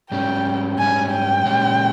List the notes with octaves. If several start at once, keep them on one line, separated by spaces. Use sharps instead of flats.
G#2 G3 C#4 G5
G#2 G3 C#4 G#5
G5
A#2 G#3 C#4 G4